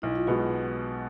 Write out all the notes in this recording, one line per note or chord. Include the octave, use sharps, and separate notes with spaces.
B1 E4
F4
B2 G#3 B3 F#4
F4